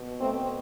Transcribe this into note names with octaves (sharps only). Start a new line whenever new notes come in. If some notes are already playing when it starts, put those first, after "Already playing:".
Already playing: B2
A3 C4